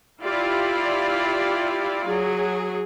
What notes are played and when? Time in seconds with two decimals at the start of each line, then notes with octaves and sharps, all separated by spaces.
0.22 E4 F4 G4 D5 F5
2.07 F#3 G#4